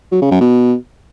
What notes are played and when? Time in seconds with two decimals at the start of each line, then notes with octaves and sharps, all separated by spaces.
0.12 F#3
0.21 C#3
0.31 F#2
0.41 B2